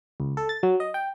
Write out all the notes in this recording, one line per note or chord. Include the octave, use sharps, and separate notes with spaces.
C#2
A4
A6
F#3
D#5
G5